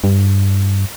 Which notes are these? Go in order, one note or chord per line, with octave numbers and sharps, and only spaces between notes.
G2